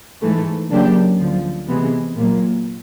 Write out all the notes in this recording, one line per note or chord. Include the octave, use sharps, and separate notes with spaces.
G#2 E3 A3
C#3 F#3 A#3 D4 G4
D2 D3 F3
C3 E3 G#3 B3
A#2 F#3 A#3